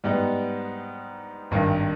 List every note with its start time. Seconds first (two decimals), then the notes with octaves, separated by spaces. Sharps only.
0.04 G#2 G3 B3 D#4
1.51 G#1 G2 D#3